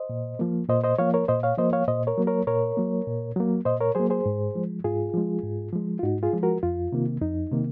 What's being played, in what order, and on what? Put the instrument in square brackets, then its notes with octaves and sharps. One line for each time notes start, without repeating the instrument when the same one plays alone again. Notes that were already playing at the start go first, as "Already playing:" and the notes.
Already playing: [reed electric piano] C5 D#5
A#2
F3 A#3
A#2 C5 D#5
C5 D#5
F3 A#3 C#5 F5
A#4 C#5
A#2 C5 D#5
C#5 F5
F3 A#3 C5 D#5
C#5 F5
A#2 C5 D#5
A#4 C#5
F#3 A#3
A#4 C#5
A#2 A#4 C#5
F#3 A#3
A#2
F#3 A#3
A#2 C5 D#5
A#4 C#5
F#3 A#3 G#4 C5
G#4 C5
G#2
F3 G#3
G#2 F4 G#4
F3 G#3
G#2
F3 G#3
F4
G#2 D#4 F#4
F4 G#4
F3 G#3
F#4 A#4
F2 F4
C3 D#3 A#3
F2 D#4
C3 D#3 A#3